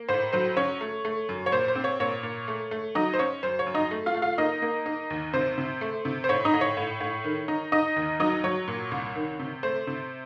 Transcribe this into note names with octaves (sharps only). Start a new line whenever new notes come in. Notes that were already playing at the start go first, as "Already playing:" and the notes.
Already playing: A#3
A2 C5
F#3 C5
C#4 C#5
A3
A3
F#2
C#5
A#2 C5
C5
C4
C#5
A#2 C#5
A#2
A3
A3
F#3 D#4 D#5
C5
C#4 C#5
F#2 C5
C#5
F#2
D#4 D#5
A3
F4 F5
A3
F4 F5
A#3 D#4 D#5
A#3
D#4
D#2
C3 C5
C3
A3
C3
C5
A2 C#5
D#4 D#5
A2
C#5
A2
A2
D#3
D#4
D#4 D#5
D#2
F#3 D#4 D#5
F#3 C#5
A#2
C2
D#3
C3
A3 C5
C3